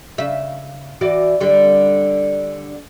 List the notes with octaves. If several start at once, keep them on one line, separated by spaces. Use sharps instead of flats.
C#3 E5
E3 F#4 D5
D3 G3